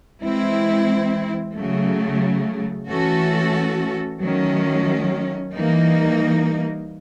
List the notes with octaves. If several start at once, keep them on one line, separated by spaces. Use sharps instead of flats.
E3 G#3 C4 E4
C#3 F#3 A3
E3 A3 C#4 F#4 A4
D#3 F#3 A3 C#4
E3 G3 A#3 D#4